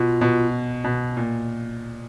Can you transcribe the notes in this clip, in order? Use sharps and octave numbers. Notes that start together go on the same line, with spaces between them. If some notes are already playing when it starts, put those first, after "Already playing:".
Already playing: B2 F4
B2
B2
A#2